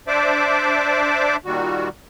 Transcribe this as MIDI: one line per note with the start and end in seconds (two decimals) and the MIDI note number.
0.08 1.36 62
0.08 1.36 72
0.08 1.36 74
0.08 1.36 76
0.08 1.36 86
1.45 1.89 46
1.45 1.89 51
1.45 1.89 55
1.45 1.89 66